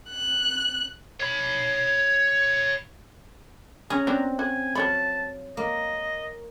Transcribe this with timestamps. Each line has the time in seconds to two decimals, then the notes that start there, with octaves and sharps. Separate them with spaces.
0.10 F#6
1.20 C#5 B5
3.90 C#4 G#4 A#5
4.07 B3 C4 D4 F#4
4.39 F#4 G#5
4.75 F3 F#3 C#5 F5 A5 B5
5.57 A#3 D#5